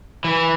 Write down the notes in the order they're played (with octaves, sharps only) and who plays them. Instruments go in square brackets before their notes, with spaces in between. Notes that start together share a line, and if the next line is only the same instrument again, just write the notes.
[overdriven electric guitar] E3